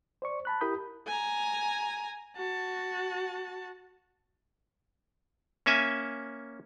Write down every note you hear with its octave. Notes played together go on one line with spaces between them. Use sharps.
C5 D5 C#6
A5 B5 F#6
E4 G4 A#4 B5 D#6 G6
G#5 A#5
F#4 A5
A#3 C#4 E5 G#5